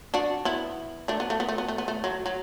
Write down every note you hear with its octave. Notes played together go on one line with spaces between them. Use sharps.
D4 F#4
B3 E4
A3 D4
B3
A3
B3
A3
B3
A3
B3
A3
F#3
F#3